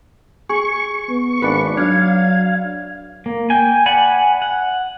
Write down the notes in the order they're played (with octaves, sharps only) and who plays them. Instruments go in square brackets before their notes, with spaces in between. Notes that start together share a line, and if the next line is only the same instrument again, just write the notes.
[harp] G#4 [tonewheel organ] C#6
[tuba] B3
[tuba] G#1 [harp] D4 B4
[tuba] F#3 [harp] D4 [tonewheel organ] F5 [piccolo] G#6
[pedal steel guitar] A#3
G5 G#5
D5 F#5 G#5 B5
F#5